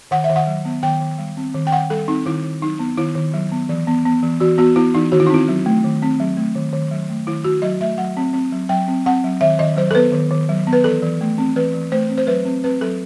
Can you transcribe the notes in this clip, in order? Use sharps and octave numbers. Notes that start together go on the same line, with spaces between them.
D#3 F#5
E5
D#3
F#5
F#3
B3
D#3 G5
D#3
G3
C4
D#3
G5
D#3 F#5
G3 A4
C4 D#4
D#3 E4
D#3
F#3 D#4
B3
D#3 E4
D#3
F#3
B3
E3
B3
B3
E3
E3 F#4
B3 F#4
B3 E4
E3 D#4
D#3 F#4
E4
D#4
C4 E4
F#3
A3
D#3
C4
F#3
A3
D#3
D#3
F#3
A3
D#3 E4
D#3 F#4
F#3 D#5
A3 E5
F#3 F#5
C4
C4
F#3
F#3 G5
C4
C4 F#5
F#3
D#3 E5
D#3 D#5
F#3 C5
A4
B3 B4
D#3
D#3
F#3
B3
B4
E3 A4
E3
A3
C4
E3 B4
E3
A3 C5
C4
C5
F#3 B4
C4
C4 B4
F#3 A4